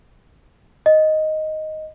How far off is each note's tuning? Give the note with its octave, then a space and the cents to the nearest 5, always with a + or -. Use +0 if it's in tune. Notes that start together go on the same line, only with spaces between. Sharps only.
D#5 +0